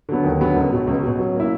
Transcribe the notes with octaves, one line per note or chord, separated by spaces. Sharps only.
D3 F#3 B3
D#2
D3 F#3 B3
C#2
B2 F#3
C#2
B2 F#3
F#3
A#3 C#4 E4